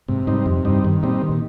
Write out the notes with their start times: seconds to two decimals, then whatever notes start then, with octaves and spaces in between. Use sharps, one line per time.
0.08 G#2 C3
0.27 G#2 G3 C4 D#4
0.46 F2 C3
0.65 G2 G3 C4 D#4
0.84 G2 D#3
1.03 A#2 G3 C4 D#4
1.22 D#3
1.29 A#2